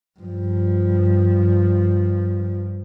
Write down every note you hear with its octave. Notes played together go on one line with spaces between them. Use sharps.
G2 F3